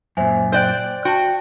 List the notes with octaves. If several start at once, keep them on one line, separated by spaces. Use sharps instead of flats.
F#2 A#2 C5 E5 G#5
C5 D5 G5 F#6 G6
F#4 G5 A5 D7